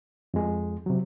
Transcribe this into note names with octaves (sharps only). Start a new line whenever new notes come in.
F2 G#3
C3 F#3